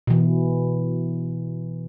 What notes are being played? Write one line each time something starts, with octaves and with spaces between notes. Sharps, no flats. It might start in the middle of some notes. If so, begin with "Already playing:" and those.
B2 E3